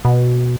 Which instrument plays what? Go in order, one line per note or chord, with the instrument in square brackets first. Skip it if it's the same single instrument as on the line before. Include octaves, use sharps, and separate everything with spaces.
[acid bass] B2